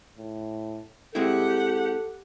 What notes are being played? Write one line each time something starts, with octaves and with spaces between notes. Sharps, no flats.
A2
G#3 C4 E4 G4 A4 F#5